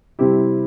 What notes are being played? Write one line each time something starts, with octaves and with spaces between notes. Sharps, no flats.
C3 G3 C4 E4 G4